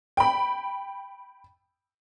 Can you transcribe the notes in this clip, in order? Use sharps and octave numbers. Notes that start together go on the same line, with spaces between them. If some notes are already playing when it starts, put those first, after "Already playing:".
G5 B5